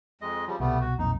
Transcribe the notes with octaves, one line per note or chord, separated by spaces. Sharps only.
F2 G#3 D#5
C#3 F3 G3
C2 B2 G3 A3 B3
F#4
B1 F2 A#2 D#4